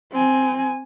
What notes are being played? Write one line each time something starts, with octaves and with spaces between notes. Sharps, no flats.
C4 G#5